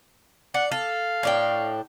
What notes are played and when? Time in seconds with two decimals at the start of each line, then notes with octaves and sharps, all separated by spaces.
0.54 D4 F#5
0.72 A4 F5
1.23 A2 D4 G5